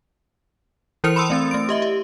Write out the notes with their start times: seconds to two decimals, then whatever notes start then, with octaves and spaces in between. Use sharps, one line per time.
1.04 E3 E4 A#4 C5 C#7 F7
1.16 B5 C6 D#6 E6
1.30 A3 C4 A6
1.51 A3 D7
1.69 G4 D#5 E5
1.82 G4